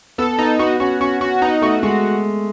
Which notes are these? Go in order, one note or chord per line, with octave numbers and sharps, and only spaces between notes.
B3 A4
B3 D#4
B3 F#4
C#4 F#4
C#4 F#4
C#4 F#4
B3 D#4
A3 F#4
G#3 F#4